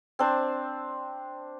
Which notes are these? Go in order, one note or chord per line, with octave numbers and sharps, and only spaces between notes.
C4 D4 C5